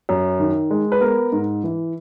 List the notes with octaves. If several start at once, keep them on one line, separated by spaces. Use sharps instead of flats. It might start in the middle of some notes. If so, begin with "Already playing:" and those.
F#2
D#3
G#3
B4
B3 A#4
G#2
E3